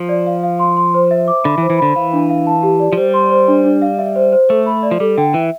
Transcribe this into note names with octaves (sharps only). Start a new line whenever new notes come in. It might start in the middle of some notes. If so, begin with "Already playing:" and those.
Already playing: F3
D5
F5
F5
C6
C6
C5
E5
D6
D3 B5
E3
C5
E3
D3 B5
E3 F5
D4
F5
A5
G4
D5
F3
G3 C5
C6
C5
D4
D4
F5
E5
C5
C5
A3 A4
B5
D5
F3
G3 A4
D3 G5
E3 E5